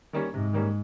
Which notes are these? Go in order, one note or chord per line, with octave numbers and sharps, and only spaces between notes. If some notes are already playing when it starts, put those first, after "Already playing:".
D#3 G3 A#3 C#4
G#2 C3
D#3 G3 A#3 C#4